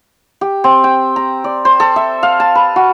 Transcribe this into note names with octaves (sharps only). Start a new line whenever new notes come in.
G4
C4
G5
A#5
D5
C5
A4
E5
F5
A5
B4
F#4